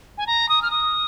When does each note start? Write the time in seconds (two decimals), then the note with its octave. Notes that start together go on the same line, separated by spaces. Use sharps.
0.18 G#5
0.27 A#5
0.49 D#6
0.62 F6
0.71 D#6